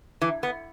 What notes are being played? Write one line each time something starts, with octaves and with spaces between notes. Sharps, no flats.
E3
B3